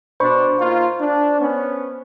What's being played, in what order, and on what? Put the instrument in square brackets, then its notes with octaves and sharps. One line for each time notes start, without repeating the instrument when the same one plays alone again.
[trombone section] B2 D4 [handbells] C5 B5 C#6
[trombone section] A#3 D#4 F4
D4
B3 C#4